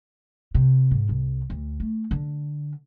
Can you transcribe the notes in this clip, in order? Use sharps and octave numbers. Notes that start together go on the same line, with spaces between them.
C3
G#2
C2
D2
A3
D3